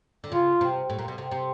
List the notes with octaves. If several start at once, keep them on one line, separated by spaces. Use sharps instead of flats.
D3
C#3 F4
C3
A2
A#2
B2
C3
C3